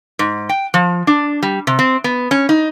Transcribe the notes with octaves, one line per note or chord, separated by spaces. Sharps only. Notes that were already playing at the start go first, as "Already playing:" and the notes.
G#2
G5
F3
D4
G3
C3
C4
B3
C#4
D#4